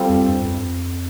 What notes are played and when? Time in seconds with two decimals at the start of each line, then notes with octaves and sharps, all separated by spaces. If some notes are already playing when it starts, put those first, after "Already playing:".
Already playing: G3 C4 F4 A4
0.10 F2
0.27 G2
0.45 F2